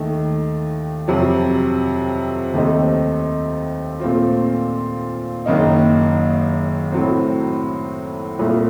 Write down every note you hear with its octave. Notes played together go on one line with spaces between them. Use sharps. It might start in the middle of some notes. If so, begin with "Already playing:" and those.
Already playing: D#2 D#3 A3
F2 C3 F#3
D#2 D#3 A3 C4 D#4
A#2 A3 C4 F4
F#1 F#2 D#3 A#3 D#4
A2 F#3 C4
C2 A#2 A3